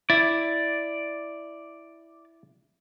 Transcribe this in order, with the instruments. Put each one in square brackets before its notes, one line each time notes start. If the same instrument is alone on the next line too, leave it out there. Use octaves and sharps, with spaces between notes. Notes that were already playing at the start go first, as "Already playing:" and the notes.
[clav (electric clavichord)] E4 [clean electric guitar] D5